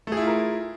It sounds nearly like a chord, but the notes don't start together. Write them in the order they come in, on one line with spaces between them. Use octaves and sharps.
A3 G#4 E4 F4 A#4